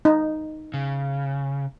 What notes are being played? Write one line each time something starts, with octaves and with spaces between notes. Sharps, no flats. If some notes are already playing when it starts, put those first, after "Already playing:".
D#4
C#3